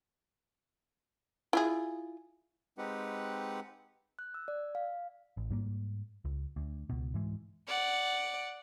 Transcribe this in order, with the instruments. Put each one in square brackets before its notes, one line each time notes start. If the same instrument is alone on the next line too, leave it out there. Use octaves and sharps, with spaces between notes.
[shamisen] E4 F4 G#4
[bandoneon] G#3 C4 D#4 G4 B4 F#5
[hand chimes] F#6
E6
D5
F5
[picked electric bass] A1
G#2 G3 A#3
C#2
D2
C#2 B2
G#2 E3 G#3
[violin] D5 F#5